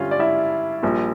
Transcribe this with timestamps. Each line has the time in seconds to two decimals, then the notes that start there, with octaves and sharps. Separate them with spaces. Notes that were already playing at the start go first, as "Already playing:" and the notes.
Already playing: G2 D3 G3 C#4 F4 F5
0.11 D5
0.19 E4 E5
0.83 A#1 A#2 G3